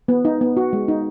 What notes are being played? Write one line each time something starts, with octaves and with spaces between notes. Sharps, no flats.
B3
D#4
B3
F#4
G#3
D#4